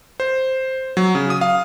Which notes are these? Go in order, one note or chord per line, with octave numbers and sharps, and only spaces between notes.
C5
F#3
C#3
D#6
F5